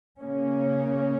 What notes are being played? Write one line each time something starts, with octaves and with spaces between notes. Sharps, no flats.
C#3 A#3 C#4